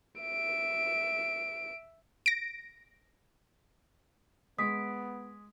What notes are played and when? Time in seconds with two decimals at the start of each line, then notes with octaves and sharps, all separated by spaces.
0.22 E5 D7
2.26 A#6 D7
4.59 G#3 B3 D#6 B6 D7